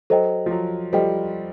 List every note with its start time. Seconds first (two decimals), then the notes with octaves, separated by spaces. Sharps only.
0.10 F#3 A4 C5 D#5 G5
0.46 F3
0.51 F#3
0.93 F3 G3 A4 C5 D#5 G5